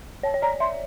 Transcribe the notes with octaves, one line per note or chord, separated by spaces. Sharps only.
C#5 A5
C#5
D5 A#5
E5 C6